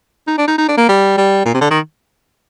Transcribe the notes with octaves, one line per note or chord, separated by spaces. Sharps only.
D#4
D4
D#4
D#4
D4
A#3
G3
G3
A#2
C3
D3
D#3